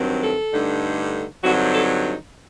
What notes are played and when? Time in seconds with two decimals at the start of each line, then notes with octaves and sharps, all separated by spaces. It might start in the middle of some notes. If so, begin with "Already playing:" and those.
Already playing: G2 D#3 F#3 C4
0.23 A4
0.53 G2 D3 A3 D#4
1.43 G2 D3 F#3 C4 D#4 F#4
1.73 A4